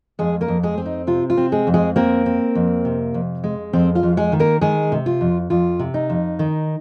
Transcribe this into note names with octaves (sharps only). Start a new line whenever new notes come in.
F2 G#3 G#4
A#3 A#4
F2
G#3 G#4
C4
D#4
C3 F4
F4
C4
G#3 G#4
F2
G#3 G#4
A#3 C4 A#4
C4
F2
C3
F2
G#3
F2 C4 C5
F4 F5
F2
G#3 G#4
D#3
A#3 A#4
D#3 G#3 G#4
C3
F4
F2
F2 F4
C3
D#4
F2
D#3